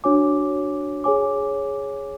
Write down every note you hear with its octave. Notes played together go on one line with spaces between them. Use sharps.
D4 F#4 C#5 G#5 D6
G#4 C#5 G#5 D6